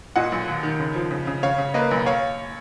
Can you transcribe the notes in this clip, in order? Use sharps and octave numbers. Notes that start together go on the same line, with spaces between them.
A#2 D#5 F#5
B1
D#2
D#3
C#3
F3
C#3
C#3
C#3 C#5 F5
C#3
A#3 B4 D#5
B1
C#5 F5